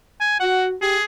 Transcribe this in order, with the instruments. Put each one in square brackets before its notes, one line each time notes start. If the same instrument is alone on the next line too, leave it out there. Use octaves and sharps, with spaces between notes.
[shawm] G#5
[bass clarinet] F#4 [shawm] F#5
[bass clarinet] G4 [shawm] G#4